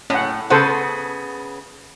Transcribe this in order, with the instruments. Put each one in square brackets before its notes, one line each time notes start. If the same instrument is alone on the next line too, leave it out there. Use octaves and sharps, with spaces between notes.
[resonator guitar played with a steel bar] A2 [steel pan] C#4 F#5
[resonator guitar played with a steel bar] C#3 B3 [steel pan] A4 C5 F#5